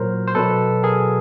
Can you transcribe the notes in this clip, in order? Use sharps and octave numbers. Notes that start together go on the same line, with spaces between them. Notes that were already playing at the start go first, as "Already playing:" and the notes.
Already playing: A#2 F#3 A#4 C5
C5
B2 F#3 A4 B4
G#4 A#4